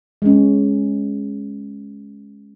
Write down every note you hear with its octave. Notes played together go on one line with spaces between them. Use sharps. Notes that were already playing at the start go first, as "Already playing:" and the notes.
G#3 C#4